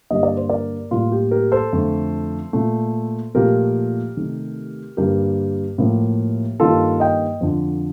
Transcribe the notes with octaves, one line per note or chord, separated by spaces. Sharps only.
G2 D3 G3 A#3 D#5
D5
C5
A#4 D5
A2 G3 A#3 F4
G4
G4 A#4
A4 C5
F2 D3 F3 A3
A#2 A3
A#2 F3 A3 G4 A#4
C3 D#3 A3
G2 D3 G3 A#3 G4 A#4
A2 F3 A#3
G2 D#3 A#3 F4 A4
D#5 G5
F2 D3 F3